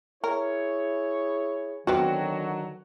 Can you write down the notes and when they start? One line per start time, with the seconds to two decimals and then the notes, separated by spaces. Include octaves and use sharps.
0.24 E4 G#4 A#4 C#5
1.87 D3 D#3 F#3 G3 B3 C4 F#4